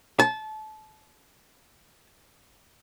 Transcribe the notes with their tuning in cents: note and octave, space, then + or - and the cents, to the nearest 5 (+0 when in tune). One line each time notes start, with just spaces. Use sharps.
A5 -25